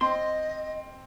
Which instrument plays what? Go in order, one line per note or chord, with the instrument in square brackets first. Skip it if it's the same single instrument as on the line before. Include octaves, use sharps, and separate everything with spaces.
[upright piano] C4 [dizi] D#5 [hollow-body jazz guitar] C6